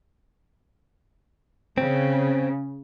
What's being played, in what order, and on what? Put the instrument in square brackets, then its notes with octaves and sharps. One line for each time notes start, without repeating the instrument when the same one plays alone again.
[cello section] C#3 [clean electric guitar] C4